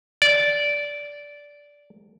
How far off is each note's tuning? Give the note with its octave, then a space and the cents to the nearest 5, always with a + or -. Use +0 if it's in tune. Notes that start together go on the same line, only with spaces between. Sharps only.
D5 -10